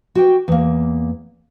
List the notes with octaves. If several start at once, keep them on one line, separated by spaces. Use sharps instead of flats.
F#4 G4 G5
E2 A#3